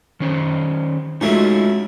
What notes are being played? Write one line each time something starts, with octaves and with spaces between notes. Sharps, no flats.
D#3 C#4 C5
C#2 F#3 A3 D#4 F4 E5